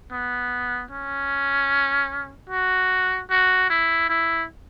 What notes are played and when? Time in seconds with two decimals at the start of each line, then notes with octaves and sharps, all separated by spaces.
0.11 B3
0.91 C#4
2.49 F#4
3.30 F#4
3.70 E4
4.09 E4